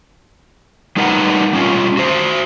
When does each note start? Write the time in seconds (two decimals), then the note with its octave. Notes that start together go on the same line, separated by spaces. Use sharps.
0.96 G3 D#4 A#4 B4 F#5
1.53 G3 C#4 F4
1.97 F#4 C5